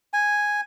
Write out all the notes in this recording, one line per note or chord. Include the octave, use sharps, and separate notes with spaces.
G#5